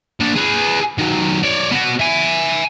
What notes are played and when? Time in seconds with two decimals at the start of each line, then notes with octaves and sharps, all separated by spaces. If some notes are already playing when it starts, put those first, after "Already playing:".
0.20 A#2 D4
0.35 G#4 B4
0.98 D#3 F#3
1.43 C#5 D5
1.71 B3 F#4
2.00 E5 G#5